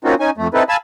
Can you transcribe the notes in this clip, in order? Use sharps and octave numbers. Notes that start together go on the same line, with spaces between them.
A#3 C4 C#4 D#4 F4 F#4
C#4 D#4 G#5
F2 A3
C4 D#4 E4 A4 B4
F5 G#5 A5 B5 E6